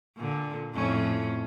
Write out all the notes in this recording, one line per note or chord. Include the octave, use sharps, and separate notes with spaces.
A#2 D3
F2 A2 C#4